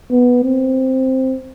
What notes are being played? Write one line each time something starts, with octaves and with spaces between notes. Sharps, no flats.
B3
C4